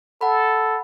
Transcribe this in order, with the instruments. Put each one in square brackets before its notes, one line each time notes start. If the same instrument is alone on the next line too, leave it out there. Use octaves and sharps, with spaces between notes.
[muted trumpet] A4 [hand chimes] F#5 B5